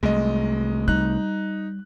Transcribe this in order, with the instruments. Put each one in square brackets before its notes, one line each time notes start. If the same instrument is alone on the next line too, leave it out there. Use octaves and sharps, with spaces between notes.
[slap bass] C2 A3 [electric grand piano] G#3 D#5
[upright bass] G3 [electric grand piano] D#4 F#6